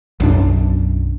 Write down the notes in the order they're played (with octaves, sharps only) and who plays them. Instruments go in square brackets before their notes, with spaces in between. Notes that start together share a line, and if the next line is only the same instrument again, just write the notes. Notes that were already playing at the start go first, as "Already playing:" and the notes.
[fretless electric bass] B1 F#2 D4